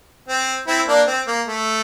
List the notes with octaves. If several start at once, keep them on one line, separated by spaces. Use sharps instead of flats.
C4
C4 E4
A#3 D4
C4
A#3
A3